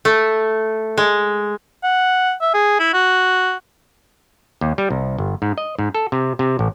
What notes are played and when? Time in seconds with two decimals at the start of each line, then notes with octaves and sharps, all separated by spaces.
0.05 A3
0.98 G#3
1.83 F#5
2.41 E5
2.54 G#4
2.79 E4
2.94 F#4
4.61 D#2
4.78 G3
4.90 C2
5.18 G1
5.42 G#2
5.58 D#5
5.79 G#2
5.95 A4
6.12 C3
6.39 C3
6.59 A1